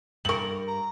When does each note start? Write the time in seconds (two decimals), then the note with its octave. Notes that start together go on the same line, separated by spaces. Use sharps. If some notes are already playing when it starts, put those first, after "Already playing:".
0.25 G2 A#4 C#6 F#7
0.67 A#5